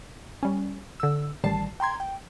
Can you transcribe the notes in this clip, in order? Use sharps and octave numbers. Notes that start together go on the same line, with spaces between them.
G3 C#4
D3 E6
A1 D#3 G3 A5 C7
G5 A#5 C6 G#6
G5